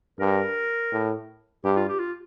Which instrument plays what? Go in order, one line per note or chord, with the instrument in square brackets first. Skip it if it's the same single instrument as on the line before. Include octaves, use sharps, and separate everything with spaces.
[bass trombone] G2 [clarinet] A#4
[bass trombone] A2
[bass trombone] G2 [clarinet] G4
[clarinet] F4
G4
F4